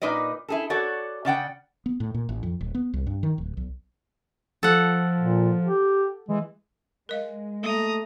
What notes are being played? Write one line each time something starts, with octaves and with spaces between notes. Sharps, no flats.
A#2 D#4 B4 D5 D#5
E4 G#4 A4
F#4 A4 C#5 D5 F#5
C#3 D5 F#5 G5
B3
A2
A#2
A1
F2
D#1
B3
C2
G2
D#3
D1
B1
F3 A4 F#5
A#2
G4
E3 G#3
G#3 A#4 D#5 F5
A3 A#3 A#5 D#6